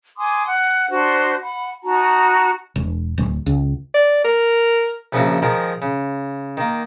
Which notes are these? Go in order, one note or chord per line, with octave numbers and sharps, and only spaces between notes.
G#5 C6 D6 D#6
F#5
D4 F#4 C5
F#5 B5
D#4 F#4 A5 A#5
E1
D1
C#2
D5
A#4
A#1 C#3 F3 A#3 F#4 E5
D#3 F3 G#3 A#4 D#6
C#3
D#3 A#3